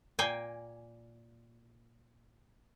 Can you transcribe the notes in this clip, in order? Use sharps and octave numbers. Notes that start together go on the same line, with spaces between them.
A#2 A#3 G5 G#5